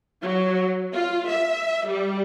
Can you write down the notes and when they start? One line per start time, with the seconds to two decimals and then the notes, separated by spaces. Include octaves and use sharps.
0.22 F#3
0.94 F4
1.29 E5
1.88 G3